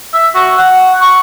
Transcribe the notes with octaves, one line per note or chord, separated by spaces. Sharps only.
E5
F#4
F#5
C#6